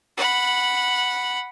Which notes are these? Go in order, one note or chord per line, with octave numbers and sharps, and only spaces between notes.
F#5 B5